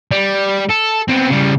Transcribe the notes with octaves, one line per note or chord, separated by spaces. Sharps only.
G3
A4
B3 C4
C#3 G3